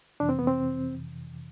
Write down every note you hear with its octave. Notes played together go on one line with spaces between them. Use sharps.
F2 C3 E3 D4
C4
B3
C4